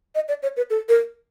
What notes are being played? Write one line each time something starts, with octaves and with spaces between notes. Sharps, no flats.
D#5
D5
C#5
B4
A4
A#4